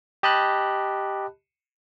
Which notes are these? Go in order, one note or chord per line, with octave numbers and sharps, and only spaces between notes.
G4 D#5 A5 B5 F#6